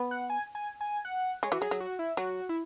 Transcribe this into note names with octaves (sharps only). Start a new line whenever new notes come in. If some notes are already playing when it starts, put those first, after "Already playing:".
Already playing: B3
F#5
G#5
G#5
G#5
F#5
G#3 C#5
E3 F#4
F#3 G#4
F#3
F#4
E4
F#3 F#4
E4